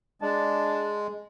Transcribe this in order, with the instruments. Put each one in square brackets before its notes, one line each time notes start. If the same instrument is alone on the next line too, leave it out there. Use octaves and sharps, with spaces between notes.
[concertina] G#3 [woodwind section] D4 A5